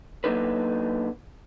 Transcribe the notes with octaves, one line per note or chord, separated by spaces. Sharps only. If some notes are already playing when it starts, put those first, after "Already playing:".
F#3 A#3 D4 D#4 A4 B4